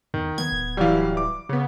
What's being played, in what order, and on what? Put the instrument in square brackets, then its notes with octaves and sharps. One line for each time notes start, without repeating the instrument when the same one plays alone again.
[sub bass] E2 [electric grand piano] D#3
[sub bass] D#3 [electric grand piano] B3 [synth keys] G#6
[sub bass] D1
[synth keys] E3 G3 [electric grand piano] F#3 F5
[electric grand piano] D6
[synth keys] C#3 B3